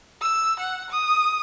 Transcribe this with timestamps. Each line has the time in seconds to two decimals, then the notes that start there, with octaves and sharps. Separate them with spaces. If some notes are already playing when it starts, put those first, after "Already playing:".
0.22 E6
0.59 F#5
0.90 D#6